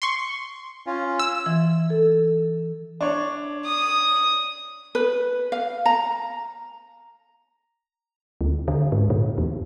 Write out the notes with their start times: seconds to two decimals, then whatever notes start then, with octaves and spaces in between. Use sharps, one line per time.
0.02 C6 C#6
0.87 C#4 F4
1.19 E6
1.46 E3
1.90 A4
3.01 D4 C#5
3.65 D#6
4.95 B4
5.52 F5
5.86 A#5
8.41 D2
8.68 D3
8.92 G#2
9.10 A#2
9.38 E2